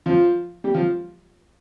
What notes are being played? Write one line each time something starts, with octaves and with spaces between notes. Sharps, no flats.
F3 F4
G3 G4
F3 F4